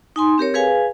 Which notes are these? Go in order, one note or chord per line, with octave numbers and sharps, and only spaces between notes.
D#4 G#5 C6
C4 G4 A#4 C#5
G#4 B4 F5 G#5